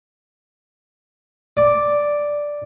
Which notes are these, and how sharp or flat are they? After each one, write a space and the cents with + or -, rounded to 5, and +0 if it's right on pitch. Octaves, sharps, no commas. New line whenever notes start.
D5 +0